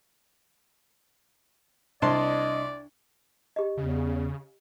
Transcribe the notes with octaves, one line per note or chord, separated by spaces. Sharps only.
C2 D4 D5 D#5 A5 C6
G4 D#5
E2 C#3